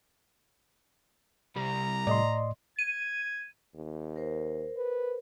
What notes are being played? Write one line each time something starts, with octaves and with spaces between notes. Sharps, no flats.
C2 G3 A#5
A2 D5 D#5 C6
G#6 D#7
D#2
A#4 C5
B4